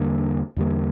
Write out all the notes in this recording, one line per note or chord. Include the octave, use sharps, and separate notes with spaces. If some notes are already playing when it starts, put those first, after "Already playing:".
Already playing: E2 D3 G3 A#3
E2 D3 G3 A#3